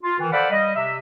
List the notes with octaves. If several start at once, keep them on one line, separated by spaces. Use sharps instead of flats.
F4
D#3 E3
A4 C5 D5 F5 F#5 B5
G3 D#5
C3 E5